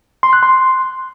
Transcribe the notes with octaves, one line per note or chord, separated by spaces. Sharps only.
C6
F#6
C6